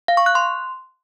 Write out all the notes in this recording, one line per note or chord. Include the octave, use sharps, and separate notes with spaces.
F5
C#6
F#6
C6